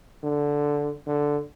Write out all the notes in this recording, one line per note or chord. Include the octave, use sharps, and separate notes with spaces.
D3
D3